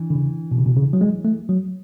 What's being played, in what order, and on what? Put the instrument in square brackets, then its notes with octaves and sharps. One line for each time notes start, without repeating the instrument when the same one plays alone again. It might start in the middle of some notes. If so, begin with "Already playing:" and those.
Already playing: [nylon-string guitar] E3 D4
[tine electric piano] D3
C#3
B2
C#3
B2
C#3
F#3
G#3
A3
F#3